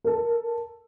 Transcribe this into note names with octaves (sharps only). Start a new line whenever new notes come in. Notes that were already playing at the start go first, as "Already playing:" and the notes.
A4 A#4